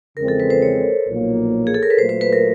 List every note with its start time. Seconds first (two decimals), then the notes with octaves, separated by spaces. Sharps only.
0.17 E2 C#3 F3 G#3 C4 A#4
0.28 A4
0.40 B4
0.50 C5
0.62 C#5
1.07 B1 A#2 F3 A#3
1.67 G#4
1.74 A4
1.83 A#4
1.90 B4
1.98 A#2 F#3 A3 C5
2.09 C5
2.21 B4
2.33 A#4